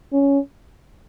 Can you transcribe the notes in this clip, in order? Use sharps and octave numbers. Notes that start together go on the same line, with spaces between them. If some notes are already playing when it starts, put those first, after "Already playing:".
C#4